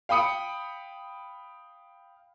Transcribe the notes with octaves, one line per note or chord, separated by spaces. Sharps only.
F5 G5 B5 D#6 C#7